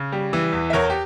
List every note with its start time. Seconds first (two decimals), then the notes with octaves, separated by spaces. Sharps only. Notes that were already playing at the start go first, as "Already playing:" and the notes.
Already playing: C#3
0.12 G3
0.33 E3
0.53 E2
0.70 E5
0.73 E2 A#4 C#5
0.90 G4